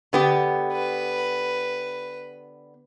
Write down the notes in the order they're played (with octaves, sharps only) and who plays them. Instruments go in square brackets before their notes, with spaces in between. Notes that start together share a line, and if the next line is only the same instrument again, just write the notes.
[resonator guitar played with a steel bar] D3 B3 G4
[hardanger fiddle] B4